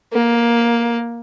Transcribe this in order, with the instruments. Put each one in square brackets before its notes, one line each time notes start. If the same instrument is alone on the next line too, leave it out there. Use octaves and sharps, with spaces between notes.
[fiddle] A#3